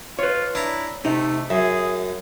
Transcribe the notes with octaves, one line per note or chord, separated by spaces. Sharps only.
F4 B4 C#5
D4 E4 A#5
C3 A3 D#4
F#2 G#4 E5